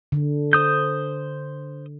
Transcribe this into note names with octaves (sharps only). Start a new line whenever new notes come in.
D3
C5 D#6 G6